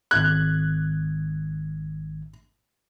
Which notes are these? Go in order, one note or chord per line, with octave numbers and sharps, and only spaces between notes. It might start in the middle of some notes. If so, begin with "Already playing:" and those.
G#1 F#6 G#6